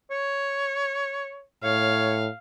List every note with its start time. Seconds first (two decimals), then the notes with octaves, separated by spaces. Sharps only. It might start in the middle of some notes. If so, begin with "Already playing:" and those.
0.11 C#5
1.63 A2 C#5 F5